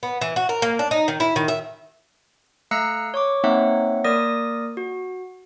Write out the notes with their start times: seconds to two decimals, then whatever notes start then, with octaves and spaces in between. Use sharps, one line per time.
0.03 B3
0.21 E3
0.36 F#4
0.49 A#4
0.62 A#3
0.79 D4
0.91 D#4
1.08 D#3
1.20 E4
1.36 D#3
1.48 E5
2.71 A3 F5 A#5 E6 F#6 C#7
3.14 C#5 C#6 D6
3.44 A#3 C4 D#4 C#5 E5 F#5
4.04 A#3 A#4 D5 D#6 A#6
4.77 F#4